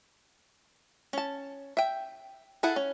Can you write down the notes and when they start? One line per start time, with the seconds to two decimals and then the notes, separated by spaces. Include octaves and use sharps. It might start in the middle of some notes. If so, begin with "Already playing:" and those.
1.13 C#4 A5
1.77 E5 G5
2.63 E4 G#4 A4 F#5
2.76 C#4